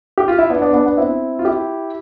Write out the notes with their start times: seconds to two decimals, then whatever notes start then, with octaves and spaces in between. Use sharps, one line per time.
0.18 G4
0.28 F4
0.38 E4
0.50 B3 D4
0.62 B3 D4
0.74 B3 D4
0.86 B3 D4
0.97 C4 E4
1.39 F4
1.45 E4 G4